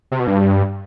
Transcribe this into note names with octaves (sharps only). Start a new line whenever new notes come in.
C3
B2
G2